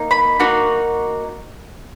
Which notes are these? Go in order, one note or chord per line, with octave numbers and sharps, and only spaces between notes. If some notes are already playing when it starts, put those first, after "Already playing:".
Already playing: A#3 D#4
B5
A#3 D#4 F#4